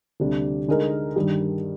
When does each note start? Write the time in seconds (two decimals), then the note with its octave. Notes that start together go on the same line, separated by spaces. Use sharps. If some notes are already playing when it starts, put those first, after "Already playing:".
0.20 D2 C3 G3 D4
0.68 D3 G#3 D#4 A#4
1.16 G2 D#3 G3